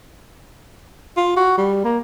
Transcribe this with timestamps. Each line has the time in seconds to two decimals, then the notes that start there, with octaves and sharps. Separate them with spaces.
1.17 F4
1.37 F#4
1.58 G3
1.84 A#3